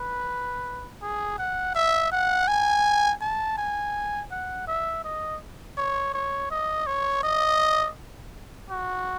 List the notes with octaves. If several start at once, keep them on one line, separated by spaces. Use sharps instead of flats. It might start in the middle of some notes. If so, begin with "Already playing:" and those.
Already playing: B4
G#4
F#5
E5
F#5
G#5
A5
G#5
F#5
E5
D#5
C#5
C#5
D#5
C#5
D#5
F#4